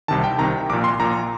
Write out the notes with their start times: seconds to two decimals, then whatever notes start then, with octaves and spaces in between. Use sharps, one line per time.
0.08 C2 C3 D#3 A5
0.24 G5
0.39 C2 C3 D#3 A#5
0.69 A#1 D6
0.73 A#2
0.84 C6
0.99 A#1 A#2 A#5